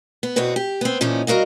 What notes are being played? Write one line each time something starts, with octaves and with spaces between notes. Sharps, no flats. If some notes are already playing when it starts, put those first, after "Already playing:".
B3
E2 B2 C4 F#4 B4
G4
B3 C4
A#2 E3 F3 C#4 D#4
G3 F#4 A#4 D#5 F5